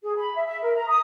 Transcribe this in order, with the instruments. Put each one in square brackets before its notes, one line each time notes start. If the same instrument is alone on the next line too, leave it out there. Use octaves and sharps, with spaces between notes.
[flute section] G#4
B5
E5
E5
A#4
A#5
D#6